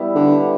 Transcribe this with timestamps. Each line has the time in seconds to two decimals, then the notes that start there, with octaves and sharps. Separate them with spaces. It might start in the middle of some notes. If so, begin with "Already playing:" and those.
Already playing: G3 B3 E4 G4
0.15 D3